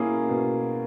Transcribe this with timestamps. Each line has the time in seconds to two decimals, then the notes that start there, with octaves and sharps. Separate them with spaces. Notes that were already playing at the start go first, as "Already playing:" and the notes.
Already playing: B2 A#3 C#4 E4 G#4
0.29 B2